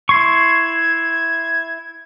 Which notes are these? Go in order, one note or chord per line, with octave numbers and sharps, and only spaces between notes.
E4 C6 C#6 G#6